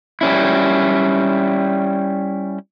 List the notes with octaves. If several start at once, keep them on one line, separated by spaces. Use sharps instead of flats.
G3 C#4 E4